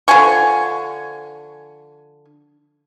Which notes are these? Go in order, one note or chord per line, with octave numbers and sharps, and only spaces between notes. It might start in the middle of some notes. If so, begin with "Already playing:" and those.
D3 F3 G#5 C#6